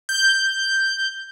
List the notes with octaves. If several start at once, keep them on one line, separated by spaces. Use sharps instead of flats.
G6